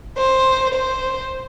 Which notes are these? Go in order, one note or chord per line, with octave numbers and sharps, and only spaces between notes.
C5
C5